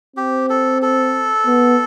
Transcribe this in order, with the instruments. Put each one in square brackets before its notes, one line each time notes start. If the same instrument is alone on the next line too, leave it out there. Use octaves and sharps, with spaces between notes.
[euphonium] C4 [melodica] G4
[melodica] A4
A4
[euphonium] B3